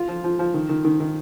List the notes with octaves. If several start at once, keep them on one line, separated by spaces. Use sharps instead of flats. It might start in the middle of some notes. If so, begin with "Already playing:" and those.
Already playing: F4
F3
F3
F3
D#3
D#3
D#3
D#3